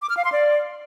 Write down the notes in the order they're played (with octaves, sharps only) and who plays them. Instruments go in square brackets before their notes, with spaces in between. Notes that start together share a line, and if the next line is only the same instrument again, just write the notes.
[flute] D6
F6
F5
C6
D5